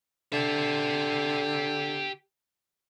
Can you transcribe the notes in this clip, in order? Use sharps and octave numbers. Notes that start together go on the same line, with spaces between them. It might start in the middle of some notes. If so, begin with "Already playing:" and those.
D3 G4 E5